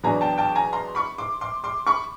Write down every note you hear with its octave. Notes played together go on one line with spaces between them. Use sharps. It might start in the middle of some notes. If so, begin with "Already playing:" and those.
E2 B2 F#3 B3 D4 G#5 A#5
G5 A5
G5 A5
G#5 A#5
A#5 C6
B5 C#6
C6 D6
C6 D6
C6 D6
B5 C#6